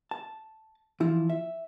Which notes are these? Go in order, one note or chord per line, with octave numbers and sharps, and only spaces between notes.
A5
E3 F3 E4
E5